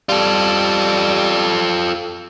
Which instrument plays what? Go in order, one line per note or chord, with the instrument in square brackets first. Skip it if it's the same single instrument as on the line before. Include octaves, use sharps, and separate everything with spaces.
[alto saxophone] G3 [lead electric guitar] F4 A4